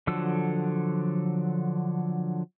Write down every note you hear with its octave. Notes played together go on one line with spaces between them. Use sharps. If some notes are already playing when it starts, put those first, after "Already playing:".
D3 F3 F#3 A4 E6